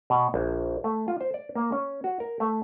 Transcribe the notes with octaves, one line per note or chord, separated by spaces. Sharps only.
B2
A#1
A3
F4
C5
D5
A#3
C#4
F#4
A#4
A3